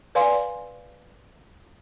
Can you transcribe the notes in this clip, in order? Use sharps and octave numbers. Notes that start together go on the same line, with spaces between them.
B4 D5 F5 G#5 C6